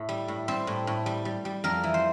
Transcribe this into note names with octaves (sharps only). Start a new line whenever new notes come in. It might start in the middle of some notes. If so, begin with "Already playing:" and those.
Already playing: A2
G3
A2
G3 C4
A2
A2
G3
G3
G3
F2 A#4
E3
C5